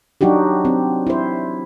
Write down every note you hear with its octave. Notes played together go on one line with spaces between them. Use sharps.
F#3 D4 D#4 F#4 G4
C4
E4 C5